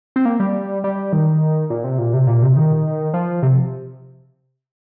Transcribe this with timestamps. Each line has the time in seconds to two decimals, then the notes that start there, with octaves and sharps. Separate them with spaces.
0.16 C4
0.25 A#3
0.40 G3
0.84 G3
1.13 D#3
1.70 A#2
1.84 C3
1.99 A#2
2.14 C3
2.27 A#2
2.42 C3
2.56 D#3
3.14 F3
3.43 C3